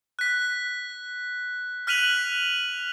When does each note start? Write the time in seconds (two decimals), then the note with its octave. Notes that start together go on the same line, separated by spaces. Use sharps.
0.19 F#6 B6
1.87 F6 F#6 B6 D#7 F7 F#7